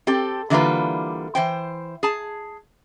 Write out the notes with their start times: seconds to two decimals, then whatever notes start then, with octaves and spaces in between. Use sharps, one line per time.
0.07 C4 G4 A4
0.50 D3 E3 G3 A#3 F4 B4
1.35 E3 C5 G5
2.03 G#4 A5